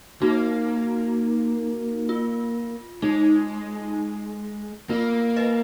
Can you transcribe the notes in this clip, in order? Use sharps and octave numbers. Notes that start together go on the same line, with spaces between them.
A#3 D#4 F#4
F4
G#3 D#4
A#3 F4
B4 D#5